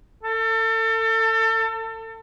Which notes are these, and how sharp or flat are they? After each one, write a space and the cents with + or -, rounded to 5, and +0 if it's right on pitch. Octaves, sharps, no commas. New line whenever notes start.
A4 +30